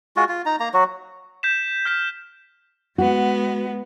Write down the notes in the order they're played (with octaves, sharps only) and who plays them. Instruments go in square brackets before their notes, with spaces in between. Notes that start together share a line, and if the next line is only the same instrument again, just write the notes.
[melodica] G#3 F4 F#4
F4
D#4 A#5
A#3 A#5
F#3 F#4
[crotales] G6 B6 E7
F6 G6 B6
[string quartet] G#3 B3 [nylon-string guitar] F#4